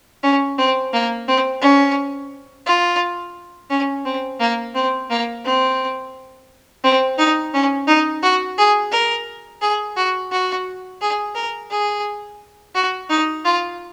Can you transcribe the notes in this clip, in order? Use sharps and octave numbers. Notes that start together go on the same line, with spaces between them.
C#4
C4
A#3
C4
C#4
F4
C#4
C4
A#3
C4
A#3
C4
C4
D#4
C#4
D#4
F#4
G#4
A#4
G#4
F#4
F#4
G#4
A#4
G#4
F#4
D#4
F4